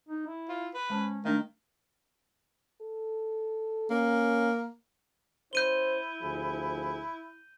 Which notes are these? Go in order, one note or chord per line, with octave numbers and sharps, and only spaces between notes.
D#4
E4
F4
B4
G#3 C#4 C5 A5
D#3 A3 D4 A#4 D#5
A4
A#3 C#4
C#4 E4 C5 G6 D#7 G7
D2 F3 G#4